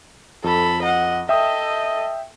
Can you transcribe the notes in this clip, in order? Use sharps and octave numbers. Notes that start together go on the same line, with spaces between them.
F2 A4 B5
D#5 F#5
A4 D#5 E5 G5 D#6